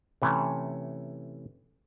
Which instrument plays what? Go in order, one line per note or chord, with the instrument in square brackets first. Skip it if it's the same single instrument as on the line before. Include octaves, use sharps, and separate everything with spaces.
[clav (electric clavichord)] C3 E3 A3 C#4